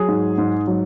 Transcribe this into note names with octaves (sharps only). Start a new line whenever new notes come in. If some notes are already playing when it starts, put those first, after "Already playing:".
Already playing: F#3 G#4
G#2
G#2
F#3